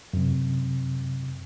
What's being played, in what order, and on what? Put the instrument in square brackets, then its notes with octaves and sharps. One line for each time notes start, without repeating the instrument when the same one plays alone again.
[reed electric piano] F#2 C3